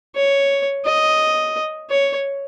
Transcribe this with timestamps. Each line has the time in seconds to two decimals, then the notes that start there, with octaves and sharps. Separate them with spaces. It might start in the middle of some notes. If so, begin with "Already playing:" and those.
0.16 C#5
0.85 D#5
1.90 C#5